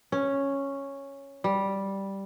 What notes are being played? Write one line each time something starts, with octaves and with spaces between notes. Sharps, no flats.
C#4
G3